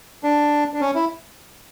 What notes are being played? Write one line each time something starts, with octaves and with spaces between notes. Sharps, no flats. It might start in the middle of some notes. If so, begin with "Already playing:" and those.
D4
D4
C#4
E4